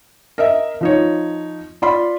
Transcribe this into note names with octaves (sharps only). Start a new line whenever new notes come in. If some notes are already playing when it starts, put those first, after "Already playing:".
A#4 D#5 E5
F3 D#4 C#5
F4 D5 B5 C6